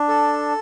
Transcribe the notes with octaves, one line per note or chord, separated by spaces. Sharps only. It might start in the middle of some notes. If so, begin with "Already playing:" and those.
Already playing: D4
A4